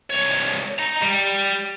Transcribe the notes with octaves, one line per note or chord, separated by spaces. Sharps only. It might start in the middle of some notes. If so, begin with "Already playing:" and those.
C2 C#5
D#5 A#5
G3